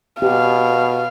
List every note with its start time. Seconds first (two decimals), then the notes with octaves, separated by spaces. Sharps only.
0.22 B2 G4 F5